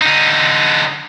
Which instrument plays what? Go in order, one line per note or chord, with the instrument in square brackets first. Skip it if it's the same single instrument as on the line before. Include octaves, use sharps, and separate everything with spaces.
[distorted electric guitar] D3 D#4